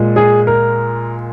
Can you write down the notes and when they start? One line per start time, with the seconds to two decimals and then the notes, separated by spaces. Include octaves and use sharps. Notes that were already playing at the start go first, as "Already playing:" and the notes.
Already playing: A#2 G#3
0.16 G#4
0.47 A#4